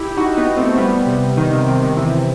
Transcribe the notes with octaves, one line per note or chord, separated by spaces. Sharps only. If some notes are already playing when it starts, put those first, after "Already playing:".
Already playing: E4 G4
D#4 F#4
B3 D#4
A3 C4
G3 B3
C3
D#3
C3
C3
D#3
C3 E3